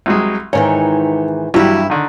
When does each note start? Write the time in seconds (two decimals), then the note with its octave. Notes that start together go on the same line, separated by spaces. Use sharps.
0.06 C2 F#3 G#3
0.53 G#2 D#3 E3 C#5
1.54 G2 E3 F#3 G3 E4
1.90 D3 D#3